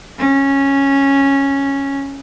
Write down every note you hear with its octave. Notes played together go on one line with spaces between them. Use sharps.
C#4